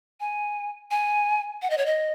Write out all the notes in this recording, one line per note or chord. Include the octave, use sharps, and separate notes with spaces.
G#5
G#5
F#5
D#5
C#5
D#5